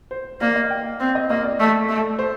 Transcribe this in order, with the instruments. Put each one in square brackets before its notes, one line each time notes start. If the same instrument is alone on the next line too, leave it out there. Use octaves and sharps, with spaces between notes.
[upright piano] C5
[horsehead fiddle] A#3 [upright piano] D5
[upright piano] D#5
G5
[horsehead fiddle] C4
[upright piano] D#5
[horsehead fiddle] A#3 [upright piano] D#5
[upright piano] D5
[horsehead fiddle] A3
A3
[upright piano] C5